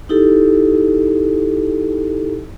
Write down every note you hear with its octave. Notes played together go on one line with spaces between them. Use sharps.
D#4 E4 G4 A4